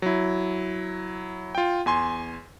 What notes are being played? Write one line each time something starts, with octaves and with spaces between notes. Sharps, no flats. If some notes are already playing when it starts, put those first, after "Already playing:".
F#3 E4
F4 G5
E2 G#5 C6